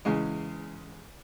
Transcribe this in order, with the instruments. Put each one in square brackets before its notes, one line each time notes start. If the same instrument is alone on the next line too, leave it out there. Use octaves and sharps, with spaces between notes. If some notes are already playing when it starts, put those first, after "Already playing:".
[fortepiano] E2 C#3 G#3